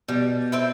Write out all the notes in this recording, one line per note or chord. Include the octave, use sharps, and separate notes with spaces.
B2 G3
C4 E4 A4